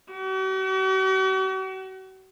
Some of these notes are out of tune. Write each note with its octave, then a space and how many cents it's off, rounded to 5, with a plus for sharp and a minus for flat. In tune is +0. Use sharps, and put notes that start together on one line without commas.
F#4 +45